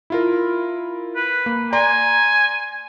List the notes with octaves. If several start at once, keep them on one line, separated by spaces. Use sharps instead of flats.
E4 F4 A#4
B4
A#3
D5 G#5 A#5 C6